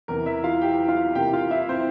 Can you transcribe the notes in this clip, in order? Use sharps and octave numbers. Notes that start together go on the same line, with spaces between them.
E2 C3 E3 A#4
E4 E5
F4 F5
G4 G5
F4 F5
C3 E3 A#3 G4 G5
F4 F5
E4 E5
C4 C5